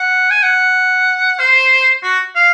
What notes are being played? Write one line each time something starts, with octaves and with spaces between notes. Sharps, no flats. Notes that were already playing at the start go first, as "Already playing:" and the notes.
Already playing: F#5
G#5
F#5
C5
F#4
F5